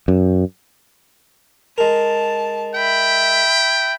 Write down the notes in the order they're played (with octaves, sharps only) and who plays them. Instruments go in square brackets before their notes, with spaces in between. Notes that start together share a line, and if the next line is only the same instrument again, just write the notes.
[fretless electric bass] F#2
[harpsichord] G#3 A#4 [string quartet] A5
[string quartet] E5 B5 [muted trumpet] G5